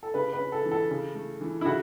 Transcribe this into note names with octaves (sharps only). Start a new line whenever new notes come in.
A4
C#3 B4
B4
C#4
A4
E3
A4
C#3
A3
E3
E4
C#3 F#4